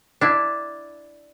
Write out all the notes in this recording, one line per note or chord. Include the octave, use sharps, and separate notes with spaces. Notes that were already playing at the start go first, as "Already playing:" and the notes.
D4 E4